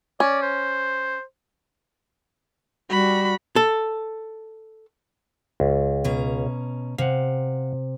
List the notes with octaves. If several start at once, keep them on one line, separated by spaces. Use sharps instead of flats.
C#4 D5
C5
G3 F#4 B5
A4
C#2
B2 C#4 A#5
C3 F5 F#5